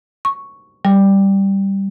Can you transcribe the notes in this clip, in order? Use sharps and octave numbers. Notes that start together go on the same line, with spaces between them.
C#6
G3